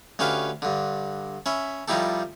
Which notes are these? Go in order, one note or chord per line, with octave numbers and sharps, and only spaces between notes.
D2 C#4 G4 B4 F5
G2 D3
C#4 E5 B5
F3 G3 D#4 E4 G4 A4